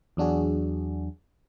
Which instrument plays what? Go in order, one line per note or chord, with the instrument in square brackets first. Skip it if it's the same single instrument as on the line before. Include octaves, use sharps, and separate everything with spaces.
[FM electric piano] E2 F#3 D4 F#4 G#4